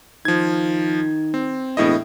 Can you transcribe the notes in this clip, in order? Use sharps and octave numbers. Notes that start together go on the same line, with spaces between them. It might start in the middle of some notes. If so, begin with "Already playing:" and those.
D#3 F3 G#6
C4
E1 A2 E4 D#5